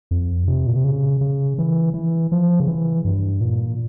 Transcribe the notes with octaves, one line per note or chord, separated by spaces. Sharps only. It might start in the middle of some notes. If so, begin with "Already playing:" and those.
F2
C3
A#2
C3
C#3
C#3
E3
E3
F3
C#3
E3
G2
A#2